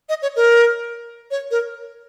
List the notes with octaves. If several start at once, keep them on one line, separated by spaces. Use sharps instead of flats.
D#5
C#5
A#4
C#5
A#4